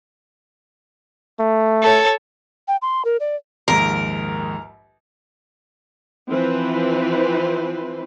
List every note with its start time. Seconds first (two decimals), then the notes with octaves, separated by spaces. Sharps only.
1.39 A3
1.83 A4 C#5
2.68 G5
2.82 C6
3.05 A#4
3.20 D5
3.68 A#1 D#2 G#2 A#4
6.29 E3 F3 C4 B4 C5